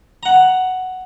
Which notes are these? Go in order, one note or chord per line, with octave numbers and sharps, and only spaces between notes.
F#5 A#5